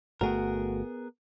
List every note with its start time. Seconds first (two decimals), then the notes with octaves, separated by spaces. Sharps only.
0.21 G1 A3 B3 F#4 G#4 A#4 G5